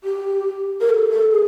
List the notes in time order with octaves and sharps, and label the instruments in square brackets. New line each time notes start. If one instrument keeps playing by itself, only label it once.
[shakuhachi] G4
A#4
A4
A4
G#4